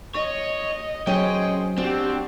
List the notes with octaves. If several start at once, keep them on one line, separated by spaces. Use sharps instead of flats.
C#5 D#5
F#3 C#4 G#4 C5 D#5 G5
C4 D4 F#4 G4